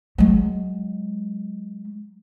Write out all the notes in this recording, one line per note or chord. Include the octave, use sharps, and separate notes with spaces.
F#3 G#3